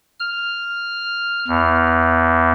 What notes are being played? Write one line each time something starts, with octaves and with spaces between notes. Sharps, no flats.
F6
E2